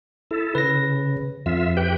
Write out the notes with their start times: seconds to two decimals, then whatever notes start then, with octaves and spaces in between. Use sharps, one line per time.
0.31 E4 A4
0.55 C#3 B4 A#6
1.46 F2 F4 E5
1.77 G4 B4 G5